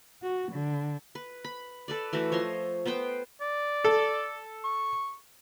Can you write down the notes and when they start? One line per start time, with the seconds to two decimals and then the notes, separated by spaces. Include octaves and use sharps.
0.21 F#4
0.51 D3
1.15 B4
1.45 B5
1.88 A4 B4 D5
2.13 E3 A3 F#4 B4
2.32 F3 C#5 D#5 C6
2.86 B3 B4 C5 G5
3.41 D5
3.85 A4
4.65 C#6